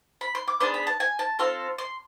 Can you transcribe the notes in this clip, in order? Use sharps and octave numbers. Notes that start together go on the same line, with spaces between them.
B5
C6
D6
B3 D4 G#4 C6
B5
A5
G#5
A5
C4 F4 A4 C6
C6